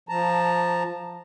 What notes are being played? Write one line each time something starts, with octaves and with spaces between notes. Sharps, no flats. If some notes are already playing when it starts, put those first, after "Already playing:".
F3 A5 A#5